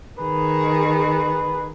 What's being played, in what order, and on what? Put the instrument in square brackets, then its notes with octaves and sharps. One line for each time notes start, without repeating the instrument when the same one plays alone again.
[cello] D#3 G#4 [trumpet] B4